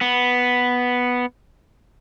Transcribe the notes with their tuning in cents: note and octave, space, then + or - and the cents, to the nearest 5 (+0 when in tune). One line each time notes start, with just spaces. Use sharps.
B3 +0